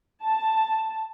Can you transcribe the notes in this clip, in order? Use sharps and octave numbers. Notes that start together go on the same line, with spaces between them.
A5